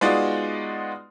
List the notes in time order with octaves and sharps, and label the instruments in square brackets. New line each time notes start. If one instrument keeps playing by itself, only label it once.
[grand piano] G#3 B3 D#4 F4 F#4 D5